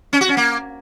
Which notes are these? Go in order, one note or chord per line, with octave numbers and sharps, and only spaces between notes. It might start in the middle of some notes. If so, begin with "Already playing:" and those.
C#4
F#4
C#4
A#3